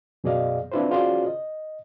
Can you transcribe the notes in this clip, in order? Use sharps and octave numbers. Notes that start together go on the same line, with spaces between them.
F#2 B2 G#4 D5 D#5 F5
C4 D4 E4 F4 B4 C5
C#4 F4 F#4 G#4 C5 D5
D#5